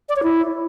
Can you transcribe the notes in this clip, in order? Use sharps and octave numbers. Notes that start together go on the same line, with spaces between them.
D5
C#5
E4